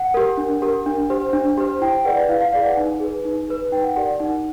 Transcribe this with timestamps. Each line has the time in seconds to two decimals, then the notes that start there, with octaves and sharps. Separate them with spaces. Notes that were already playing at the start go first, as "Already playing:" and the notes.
Already playing: F#5
0.14 G4 A#4
0.37 D4
0.62 G4 A#4
0.86 D4
1.10 G4 C5
1.33 D4
1.58 G4 C5
1.81 E4 G5
2.05 G#4 B4 D5 F#5
2.28 E4 F5
2.41 F5
2.52 G#4 B4 D5 F5
2.64 F#5
2.76 D#4 G#5
3.00 G#4 B4
3.25 D#4
3.48 G#4 B4
3.72 D#4 G5
3.84 F#5
3.96 G4 A#4 D5 F#5
4.19 D#4 F#5